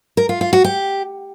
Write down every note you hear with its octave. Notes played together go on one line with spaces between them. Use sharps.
A#4
F4
F4
F#4
G4